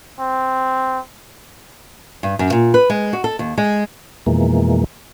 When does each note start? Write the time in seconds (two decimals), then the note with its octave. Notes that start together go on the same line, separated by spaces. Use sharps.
0.19 C4
2.23 G2
2.39 F#2
2.52 A#2
2.74 B4
2.90 G#3
3.13 F#4
3.24 A4
3.39 D#2
3.58 G#3
4.26 F2 B2 E3 G#3 A#3